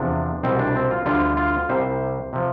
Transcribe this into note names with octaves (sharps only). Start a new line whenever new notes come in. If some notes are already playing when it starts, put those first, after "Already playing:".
Already playing: E2 C3 F3 D4
C2 B2 G3 C4
D4
C4
F4
D2 D3 G3 F4
F4
C2 C3 G3 C5
C3 F3